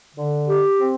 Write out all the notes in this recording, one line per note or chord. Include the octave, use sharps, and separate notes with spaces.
D3
G4
C4